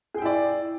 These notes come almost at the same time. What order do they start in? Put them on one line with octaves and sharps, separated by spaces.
G#4 G5 E4 D5